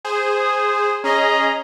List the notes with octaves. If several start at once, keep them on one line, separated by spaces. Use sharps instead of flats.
G#4 C5
D#6
C#4 G#4 D#5 A#5